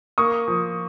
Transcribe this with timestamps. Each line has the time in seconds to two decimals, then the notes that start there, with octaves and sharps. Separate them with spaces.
0.18 A#3 C#6 D#6
0.48 F3